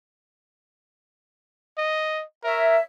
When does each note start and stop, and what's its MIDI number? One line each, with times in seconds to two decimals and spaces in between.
1.78 2.23 75
2.44 2.77 70
2.44 2.79 73
2.44 2.79 76